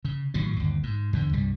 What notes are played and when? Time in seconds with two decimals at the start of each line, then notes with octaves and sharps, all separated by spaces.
0.05 C#3
0.34 A2 D#3 F3 F#3
0.56 G1 D#2
0.83 G#2
1.13 E2 D3
1.33 C2 G2 G3